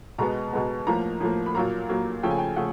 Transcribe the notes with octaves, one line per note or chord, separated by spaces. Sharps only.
B2 G#3 B3 A#5
B2 G#3 B3
A2 F3 A#3 A#5
A2 F3 A#3
B5
A#2 F#3 A#3 A#5
A#2 F#3 A#3
C#3 F3 A3 G5
G#5
G5
C#3 F3 A3 F#5